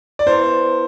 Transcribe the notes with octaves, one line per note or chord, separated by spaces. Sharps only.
D5
B3 E4 B4 C5